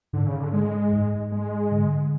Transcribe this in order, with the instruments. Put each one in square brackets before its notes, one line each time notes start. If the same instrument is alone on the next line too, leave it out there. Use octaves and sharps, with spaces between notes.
[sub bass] G#2 [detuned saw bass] D3
[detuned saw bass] C#3
D3
G#3
[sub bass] G#2
[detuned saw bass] G#3
[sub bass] D3